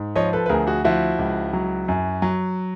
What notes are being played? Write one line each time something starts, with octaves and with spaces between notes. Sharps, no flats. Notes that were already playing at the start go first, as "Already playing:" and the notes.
Already playing: G#2
F3 C#5 D#5
A4 B4
B4
D2 G#4 A#4
F#4 G#4
F3 E4 F#4
C#2
F#3
F#2
F#3